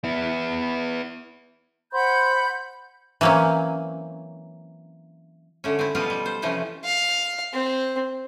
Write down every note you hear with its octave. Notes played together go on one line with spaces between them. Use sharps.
B3 E4
C5 F#5 B5 G6
E3 F#3 A#3 C4 C#4
D3 A3 C#4
C4 E4
B2 G3 F4 D#5 F5
G3
C5
C3 E3 F3 A3 C#4
F5
C4